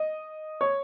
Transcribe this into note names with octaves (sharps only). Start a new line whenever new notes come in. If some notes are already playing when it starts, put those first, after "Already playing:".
Already playing: D#5
C#5